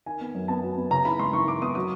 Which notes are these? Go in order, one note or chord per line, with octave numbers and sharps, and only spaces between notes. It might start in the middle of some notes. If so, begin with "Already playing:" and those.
D#3 G#5
B3
F#2
B3 A5
F#3
B3
C#3 A#5
E3 B5
G#3 C6
E3 C#6
E3 D6
B3 D#6
F#3 D#6